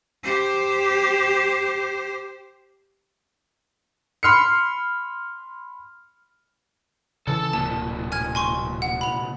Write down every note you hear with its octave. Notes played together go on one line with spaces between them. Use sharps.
G4 C5
B5 C6 F6 C7 C#7
C#3 E3 A4 A5
D1 C2 A#2 A#3 A5
G#5 F6 G#6
G#5 C6 C#6
F#5
B5 F7